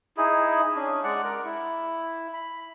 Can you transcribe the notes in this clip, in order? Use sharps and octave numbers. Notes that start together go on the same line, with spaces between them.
D#4 E4 G#4
C#4 D4
G#3 D5 F#5
A#4
E4
B5